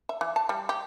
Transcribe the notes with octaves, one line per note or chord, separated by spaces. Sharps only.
E5
E3
A5
G3
G4